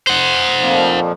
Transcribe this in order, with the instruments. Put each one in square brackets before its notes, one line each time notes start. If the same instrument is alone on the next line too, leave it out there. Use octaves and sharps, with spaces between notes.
[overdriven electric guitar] C5 F#5
[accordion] F2 A#2 F3